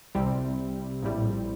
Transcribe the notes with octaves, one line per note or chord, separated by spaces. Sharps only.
C2 C3 G3 C4
A#1 A2 G3